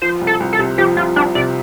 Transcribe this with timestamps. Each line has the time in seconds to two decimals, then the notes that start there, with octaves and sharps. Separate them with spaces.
0.02 F3 C5
0.21 C2
0.27 A4
0.40 C2
0.53 A4
0.59 C3
0.78 F3 G4
0.97 C2 F4
1.16 C2 D4
1.35 C3 D5